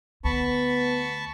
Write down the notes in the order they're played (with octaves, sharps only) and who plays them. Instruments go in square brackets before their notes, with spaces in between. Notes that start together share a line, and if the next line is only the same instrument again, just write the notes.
[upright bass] D2 [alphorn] B3 [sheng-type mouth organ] A5 B5 C#6